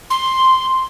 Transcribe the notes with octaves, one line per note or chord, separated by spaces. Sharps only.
C6